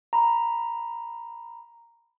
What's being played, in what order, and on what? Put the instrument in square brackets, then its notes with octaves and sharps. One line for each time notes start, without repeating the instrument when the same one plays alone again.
[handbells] A#5 B5